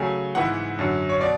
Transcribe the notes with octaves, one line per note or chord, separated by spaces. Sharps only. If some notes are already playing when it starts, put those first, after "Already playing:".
Already playing: C#3 F#3 A3 G#5
G#2 E3 B3 E4 F#5
F#2 D3 F#3
C#5
B2 D5